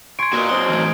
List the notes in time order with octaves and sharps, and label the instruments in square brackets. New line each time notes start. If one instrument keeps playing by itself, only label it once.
[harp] G#5 C6 C#6 [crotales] G#6 D7
[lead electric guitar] A#2 [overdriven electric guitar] F#4 B4 [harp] A#4 D#5
[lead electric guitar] F#3 C4 [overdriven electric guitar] C6 [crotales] D#6
[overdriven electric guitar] E3 A3